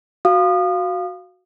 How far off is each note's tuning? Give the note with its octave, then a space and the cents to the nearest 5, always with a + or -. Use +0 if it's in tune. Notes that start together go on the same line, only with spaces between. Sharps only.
F#4 -5 F5 +0 D#6 -30